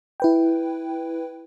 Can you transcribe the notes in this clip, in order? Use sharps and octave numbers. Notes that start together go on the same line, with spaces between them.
E4 B4 G5